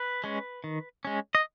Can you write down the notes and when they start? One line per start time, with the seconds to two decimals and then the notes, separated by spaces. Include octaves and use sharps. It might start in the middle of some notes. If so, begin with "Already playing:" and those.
Already playing: B4
0.24 G#3 C#4
0.64 D#3
1.05 G#3 C#4
1.35 D#5